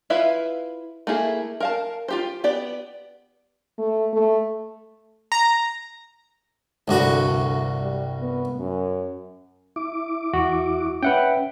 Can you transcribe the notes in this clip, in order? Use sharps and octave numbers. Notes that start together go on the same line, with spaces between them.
E4 F4 B4 E5 F5
A3 A#3 E4 G#4
A#4 F5 A5
F4 G4 C5
B3 G4 D5
A3
A3
A#5
C2 G2 D3 F#4
D2
G3
B3
F#2
E4 D6
E2 F#4
C#4 B4 E5 F#5 G5